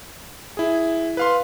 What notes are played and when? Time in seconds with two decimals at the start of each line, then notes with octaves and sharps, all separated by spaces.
0.57 E4 G#4
1.17 B4 F5 C6